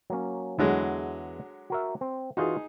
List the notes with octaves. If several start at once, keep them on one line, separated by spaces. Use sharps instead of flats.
F#3 A#3 C#4
E2 D3 F#3 G#3 E4
F#4 A#4 E5
C4
E3 D#4 F4 F#4 G#4